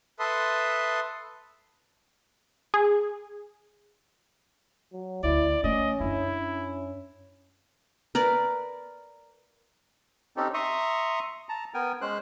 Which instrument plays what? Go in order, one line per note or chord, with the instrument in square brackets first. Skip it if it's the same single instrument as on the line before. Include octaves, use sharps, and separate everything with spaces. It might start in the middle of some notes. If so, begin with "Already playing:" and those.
[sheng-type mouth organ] A4 B4 E5 A5 C6 D#6
[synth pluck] G#4
[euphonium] F#3
[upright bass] D2 [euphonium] E4 [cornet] D5
[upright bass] E3 A3 [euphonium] C#4 [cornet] D#5
[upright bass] F#2 D4 [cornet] E4
[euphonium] C#4
[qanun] A#4 B4 D5
[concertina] C4 C#4 D#4 G4 A4
E5 A#5 C6 C#6 D#6
A5 A#5
B3 A#4 G5 G#5
G#3 C#4 C5 F#6